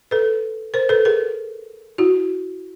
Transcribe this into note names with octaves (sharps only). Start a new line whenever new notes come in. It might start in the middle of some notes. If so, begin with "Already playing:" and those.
A4 B4
A#4 C5
A4 B4
G#4 A#4
E4 F#4